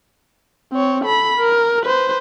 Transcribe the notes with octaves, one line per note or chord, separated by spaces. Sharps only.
C4 C#5
A4 B5
A#4
B4 C5